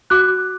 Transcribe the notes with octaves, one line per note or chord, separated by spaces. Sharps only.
F#4 D6 F#6